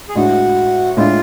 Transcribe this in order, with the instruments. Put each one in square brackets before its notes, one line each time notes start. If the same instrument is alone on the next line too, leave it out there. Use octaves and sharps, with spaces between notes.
[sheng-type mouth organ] G#4
[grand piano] A2 G#3 D4 [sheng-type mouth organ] F#4
[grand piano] A2 G#3 D4 [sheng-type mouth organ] F4